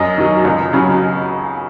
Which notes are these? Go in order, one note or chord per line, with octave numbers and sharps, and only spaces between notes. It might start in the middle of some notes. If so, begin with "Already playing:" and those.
Already playing: F#2 D#5
D#3 F#3
C#2
C#3 F#3